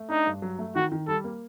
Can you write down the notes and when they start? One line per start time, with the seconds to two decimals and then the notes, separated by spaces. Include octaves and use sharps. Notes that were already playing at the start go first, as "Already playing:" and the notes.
Already playing: A3
0.10 D4 D#4
0.26 G2
0.42 F#3
0.59 A3
0.76 D#3 F#4
0.92 D#3
1.08 G3 A4
1.24 A#3